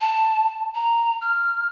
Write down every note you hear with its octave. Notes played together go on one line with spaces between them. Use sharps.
A5
A#5
F6